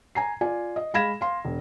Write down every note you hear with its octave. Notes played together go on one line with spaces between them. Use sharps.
G#5 A#5 C7
F4 D5 G#5
D#5
G#3 F5 B5 G#6 A#6 E7
F5 C6
E1